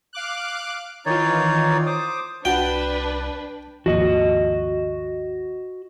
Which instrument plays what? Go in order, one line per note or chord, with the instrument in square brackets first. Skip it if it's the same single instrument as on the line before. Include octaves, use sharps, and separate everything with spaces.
[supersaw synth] F5 D6 F#6
[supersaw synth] D#3 E3 F4 [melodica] D#4 C#5 D5
[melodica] C5 D6 D#6
[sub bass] C2 [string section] D4 B4 [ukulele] F#4 [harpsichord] G5
[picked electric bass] G#1 D#2 F3 [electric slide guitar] F#4 D#5